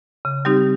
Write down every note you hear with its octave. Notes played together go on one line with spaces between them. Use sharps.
C#3
G3 C4 D#4 G4